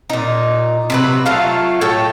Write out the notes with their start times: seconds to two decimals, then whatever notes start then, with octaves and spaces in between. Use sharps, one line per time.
0.10 A#2 D#4
0.90 C3 F#3 B4
1.25 F#3 A3 F4 F5
1.81 A2 A4 C#5 G5